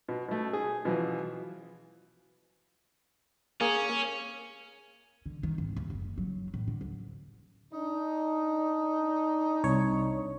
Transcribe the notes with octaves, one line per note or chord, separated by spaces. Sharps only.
B2
B2 A3
G#4
B2 E3 F3
A#3 C#4 G#4
D3
D#3
G#1
D#2
F#1
F#3
A2
D3
D2
D4 D#4
C2 C#5